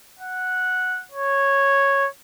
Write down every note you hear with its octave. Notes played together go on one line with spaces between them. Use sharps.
F#5
C#5